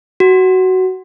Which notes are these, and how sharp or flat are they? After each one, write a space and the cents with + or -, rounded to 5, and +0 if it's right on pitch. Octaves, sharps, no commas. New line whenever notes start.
F#4 +10